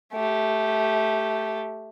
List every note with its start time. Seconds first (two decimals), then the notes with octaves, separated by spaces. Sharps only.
0.14 A3 G4